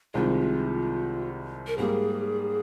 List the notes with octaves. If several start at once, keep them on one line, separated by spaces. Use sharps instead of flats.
C2 C3 D#3 G#3 F4
A#4
G#2 G3 A#3 G#4